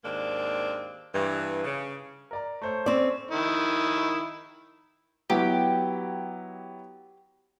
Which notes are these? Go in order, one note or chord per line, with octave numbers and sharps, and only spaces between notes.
D#2 G#2 D#3 A#3 C4 D4
G2 E3
C#3
A#4 D5 A#5
A3 C5 C#5
C4 C#4 A4 D5
D#3 E4
F#3 B3 E4 G4